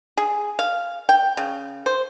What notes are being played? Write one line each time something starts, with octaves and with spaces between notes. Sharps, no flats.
G#4
F5
G5
C#3
C5